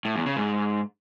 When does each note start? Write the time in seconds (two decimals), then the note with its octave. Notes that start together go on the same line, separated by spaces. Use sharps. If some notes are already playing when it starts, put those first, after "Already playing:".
0.05 A2
0.16 E2
0.26 C#3
0.37 G#2